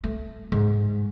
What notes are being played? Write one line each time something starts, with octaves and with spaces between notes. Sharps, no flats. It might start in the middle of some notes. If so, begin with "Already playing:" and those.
A3
G#2